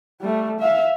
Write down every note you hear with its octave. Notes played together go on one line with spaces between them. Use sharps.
G3 A3
E5 F5